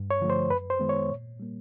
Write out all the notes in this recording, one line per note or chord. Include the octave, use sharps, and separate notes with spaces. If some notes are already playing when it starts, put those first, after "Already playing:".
Already playing: G2
C#5
D3 F3 A3
C5
F#2 B4
C5
D#3 G#3 B3
C#5
A#2
G3 A#3